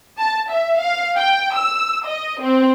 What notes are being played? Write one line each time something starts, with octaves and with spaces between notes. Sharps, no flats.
A5
E5
F5
G5
E6
D#5
C4